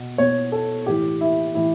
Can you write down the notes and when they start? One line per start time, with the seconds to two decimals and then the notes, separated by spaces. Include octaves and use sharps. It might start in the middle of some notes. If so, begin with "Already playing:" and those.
Already playing: B2
0.18 B2 C#5
0.52 A4
0.86 A2 E3 G4
1.21 E4
1.55 A2 E3 E4